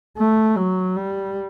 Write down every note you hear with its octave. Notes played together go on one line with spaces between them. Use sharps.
A3
F#3
G3